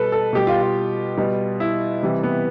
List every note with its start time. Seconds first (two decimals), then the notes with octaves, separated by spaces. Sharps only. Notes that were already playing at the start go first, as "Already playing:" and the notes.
Already playing: B2 G3 A4 B4
0.12 A4
0.33 B2 G3 G4
0.47 F4
0.61 F4
1.17 B2 G3
1.60 E4
2.03 C3 E3 G3
2.23 B3